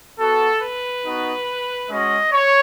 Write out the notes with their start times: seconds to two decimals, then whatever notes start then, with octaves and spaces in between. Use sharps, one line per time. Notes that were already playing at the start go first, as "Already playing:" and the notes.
0.19 B3 F#4 A4
0.62 B4
1.05 B3 D#4 F#4
1.89 G#3 C#4 F#4 D#5
2.32 C#5